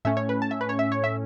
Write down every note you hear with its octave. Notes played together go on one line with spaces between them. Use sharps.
A2 A3 C#4 E5
C#5
B4
A5
E5
B4
C#5
E5
C#5
E5